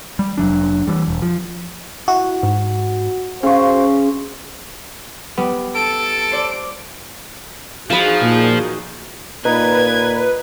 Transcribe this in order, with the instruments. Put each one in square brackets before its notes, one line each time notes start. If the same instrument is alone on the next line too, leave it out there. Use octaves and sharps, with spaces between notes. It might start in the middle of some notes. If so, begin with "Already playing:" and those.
[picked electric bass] G3
F1 F#3 D4
E3 G3
E1
F3
[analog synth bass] E4 [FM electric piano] F#4
[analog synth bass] G#2
[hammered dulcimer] C#3 C#6 [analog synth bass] C#4 [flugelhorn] C5
[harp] G3 [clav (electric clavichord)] B3
[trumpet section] A4 [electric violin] D7
[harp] C5 D5
[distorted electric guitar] F3 [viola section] D#4 F#4 G#4 [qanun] F5 B5
[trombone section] A#2
[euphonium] A#2 [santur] D#4 [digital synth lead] B4 [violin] G#6